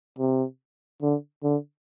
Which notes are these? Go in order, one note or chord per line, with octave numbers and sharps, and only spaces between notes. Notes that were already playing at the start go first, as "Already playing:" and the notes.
C3
D3
D3